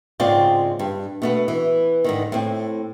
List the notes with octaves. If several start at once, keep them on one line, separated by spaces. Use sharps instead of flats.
G#2 C#3 C4 F4 D5 G5
G2
B2 A3 B3
E3
G#2 D3 D#3
A2 C4